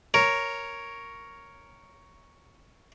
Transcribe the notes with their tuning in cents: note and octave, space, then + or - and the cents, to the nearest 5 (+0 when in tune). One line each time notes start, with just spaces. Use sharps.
A#4 +0 C#5 +0